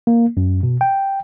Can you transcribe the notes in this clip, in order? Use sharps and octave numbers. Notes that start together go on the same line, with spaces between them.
A#3
F#2
B2
G5